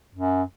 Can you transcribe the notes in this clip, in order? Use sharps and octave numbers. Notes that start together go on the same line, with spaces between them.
F#2